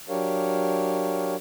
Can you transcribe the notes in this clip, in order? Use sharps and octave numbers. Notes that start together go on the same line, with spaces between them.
F#3 D4 G4 A#4 C#5 F5